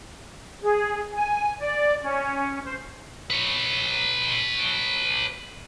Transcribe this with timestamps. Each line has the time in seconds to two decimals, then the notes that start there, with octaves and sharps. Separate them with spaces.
0.62 G#4
1.12 G#5
1.59 D5
2.03 C#4
2.64 C5
3.30 B4 C#5